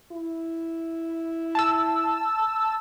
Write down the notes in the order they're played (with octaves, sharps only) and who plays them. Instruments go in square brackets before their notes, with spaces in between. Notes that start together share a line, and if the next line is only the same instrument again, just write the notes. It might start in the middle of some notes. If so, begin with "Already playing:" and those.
[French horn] E4
[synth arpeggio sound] A5 E6